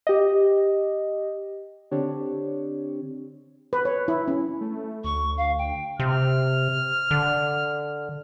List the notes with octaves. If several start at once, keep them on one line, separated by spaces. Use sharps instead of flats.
G4 D#5
D3 C4 D4 G4 C#5
B4
C#5
E4
C#4
A3
D2 C#6
F5
G5
C3 F6
D3